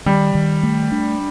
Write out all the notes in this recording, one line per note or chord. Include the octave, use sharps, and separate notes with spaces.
D#3 G3
D#3
A3
D4